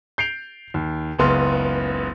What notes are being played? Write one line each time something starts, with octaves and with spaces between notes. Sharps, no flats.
G6 C7 D7 F7
D#2
F#1 C#2 B3 C6 F6